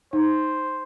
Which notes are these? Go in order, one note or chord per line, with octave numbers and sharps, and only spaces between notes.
D#4 C5